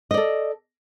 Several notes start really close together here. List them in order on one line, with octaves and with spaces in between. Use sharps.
D#5 D5 A4